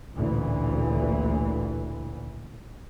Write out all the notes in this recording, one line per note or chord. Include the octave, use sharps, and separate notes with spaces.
A1 D2 A#2 E3